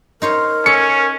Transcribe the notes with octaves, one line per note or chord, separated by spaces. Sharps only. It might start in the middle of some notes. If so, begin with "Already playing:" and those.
D#4 A#4 C5 C#5
C#4 A4 C#7